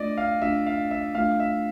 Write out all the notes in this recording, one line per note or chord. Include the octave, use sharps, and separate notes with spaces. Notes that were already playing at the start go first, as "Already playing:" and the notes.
Already playing: A3 D4 F4 D5 D#5
F5
A3 D4 F4 E5
F5
E5
A3 D4 F4 F5
E5